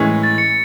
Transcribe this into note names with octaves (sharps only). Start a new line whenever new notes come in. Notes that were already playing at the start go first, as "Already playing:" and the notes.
Already playing: A2 E3 G#3 C#4
A6
C#7